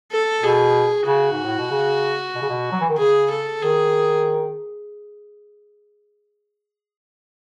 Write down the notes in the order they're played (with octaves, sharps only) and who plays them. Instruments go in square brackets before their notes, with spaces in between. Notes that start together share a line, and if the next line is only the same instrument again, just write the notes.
[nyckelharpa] A4
[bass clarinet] B2 [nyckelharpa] G#4
[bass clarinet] C#3 [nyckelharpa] F#4
[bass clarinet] G#2
A2
B2
C#3
B2
C#3
B2
F#3
E3
D#3
[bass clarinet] C#3 [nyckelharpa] G#4
[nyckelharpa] A4
[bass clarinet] D#3 [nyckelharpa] G#4